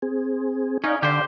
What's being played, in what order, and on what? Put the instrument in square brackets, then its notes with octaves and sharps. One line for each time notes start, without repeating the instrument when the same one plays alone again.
[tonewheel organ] C4 G#4
[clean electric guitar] C#4 [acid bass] D#4 [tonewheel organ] D5 F5
[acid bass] D3 [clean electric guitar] G4 C5